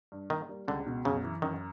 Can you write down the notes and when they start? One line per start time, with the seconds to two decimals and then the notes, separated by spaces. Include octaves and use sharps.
0.12 G2
0.30 D#3 A#3
0.49 G3
0.68 C#2 D3
0.86 B2
1.05 F#2 C#3
1.24 E3
1.42 F#2 D#3